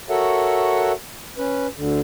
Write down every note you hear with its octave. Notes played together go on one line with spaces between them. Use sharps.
F#4 A4 A#4 C#5 E5 F#5
C#4 B4
D2 D3